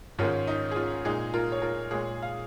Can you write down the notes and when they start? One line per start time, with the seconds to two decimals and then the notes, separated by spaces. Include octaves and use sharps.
0.19 G#2 D#3 G#3 C#4 F4
0.47 D#4
0.71 G#4
0.76 C#4 F4
1.05 A#2 G#3 D#4 G#4
1.34 F4 A#4
1.52 C#5
1.62 F4 A#4
1.91 A#2 G#3 G#4 C#5
2.23 F5